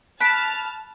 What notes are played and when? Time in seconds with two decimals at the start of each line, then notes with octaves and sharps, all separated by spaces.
0.21 A5 B5 F6 F#6 D7